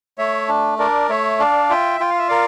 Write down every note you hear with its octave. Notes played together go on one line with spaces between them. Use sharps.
A3 C#5 E5
D4
D4 A#4 D5
A3 C#5 E5
D4 D5 F5
F4 E5 G5
F4 G5
F5
E5
A#4 D5 F5